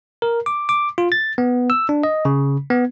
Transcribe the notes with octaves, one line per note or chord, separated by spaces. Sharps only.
A#4
D6
D6
F4
A6
B3
E6
D4
D#5
C#3
B3